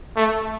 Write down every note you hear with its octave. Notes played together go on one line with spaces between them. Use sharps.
A3